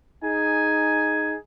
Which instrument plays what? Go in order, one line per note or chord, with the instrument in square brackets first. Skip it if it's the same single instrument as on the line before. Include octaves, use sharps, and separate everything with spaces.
[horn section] D#4 G#4 G#5